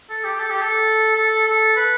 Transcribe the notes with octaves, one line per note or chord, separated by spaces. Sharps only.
A4
G4
A4
G4
A4
A4
A4
B4